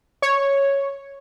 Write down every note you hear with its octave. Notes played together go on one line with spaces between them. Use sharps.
C#5